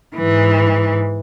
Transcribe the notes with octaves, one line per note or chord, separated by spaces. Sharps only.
G#2 E3